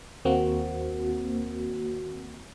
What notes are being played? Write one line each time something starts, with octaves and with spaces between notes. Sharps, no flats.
D#2 A#3 C4 F#4